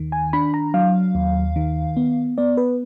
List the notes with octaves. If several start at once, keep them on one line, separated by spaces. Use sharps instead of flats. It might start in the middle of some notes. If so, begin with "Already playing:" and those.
Already playing: D#2 D#3
G#5
D4 B5
A#5
F#3 F5
D#2
D#3
B3
B3 D5
B4